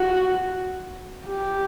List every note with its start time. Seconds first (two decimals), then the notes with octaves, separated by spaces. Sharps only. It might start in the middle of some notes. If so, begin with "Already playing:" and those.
Already playing: F#4
1.26 G4